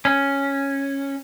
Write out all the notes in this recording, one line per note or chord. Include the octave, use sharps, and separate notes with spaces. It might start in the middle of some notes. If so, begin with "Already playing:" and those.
C#4